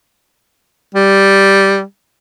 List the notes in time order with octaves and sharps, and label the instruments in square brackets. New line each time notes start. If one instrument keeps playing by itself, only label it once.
[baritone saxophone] G3